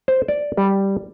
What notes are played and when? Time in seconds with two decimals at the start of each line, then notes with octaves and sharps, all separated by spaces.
0.08 C5
0.28 D5
0.57 G3